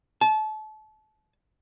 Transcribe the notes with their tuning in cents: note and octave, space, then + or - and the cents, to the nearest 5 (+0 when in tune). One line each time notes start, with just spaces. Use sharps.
A5 -30